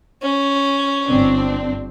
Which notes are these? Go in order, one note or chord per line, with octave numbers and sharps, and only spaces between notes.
C#4
G1 C4 D4